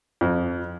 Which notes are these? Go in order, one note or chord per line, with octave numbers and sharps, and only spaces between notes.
F2